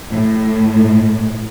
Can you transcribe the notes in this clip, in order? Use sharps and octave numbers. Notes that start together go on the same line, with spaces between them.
A2